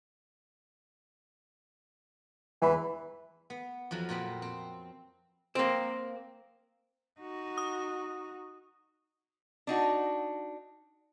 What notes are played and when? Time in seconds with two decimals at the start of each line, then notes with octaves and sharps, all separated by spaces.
2.62 E2 E3 B5
3.50 B3
3.91 F2 F3 F#3
4.09 A#2 B3 C4 B5
4.42 C4
5.55 A#3 C4
7.20 D#4 F#4
7.58 D#6
9.67 D4 D#4 F#4